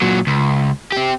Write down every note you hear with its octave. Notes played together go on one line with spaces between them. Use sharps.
A#2 F#3
C#2
C4 G4